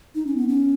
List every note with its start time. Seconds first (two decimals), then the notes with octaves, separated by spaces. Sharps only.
0.15 D#4
0.27 C#4
0.37 B3
0.48 C#4